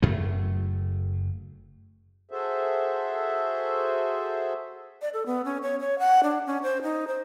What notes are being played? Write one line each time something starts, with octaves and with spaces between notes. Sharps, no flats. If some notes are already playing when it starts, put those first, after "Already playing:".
F#1 F#2 A3
F#4 G#4 A4 C5 E5
D5
A4
B3
C#4
C#5
C#5
F#5
D4
C#4
C5
D#4
C5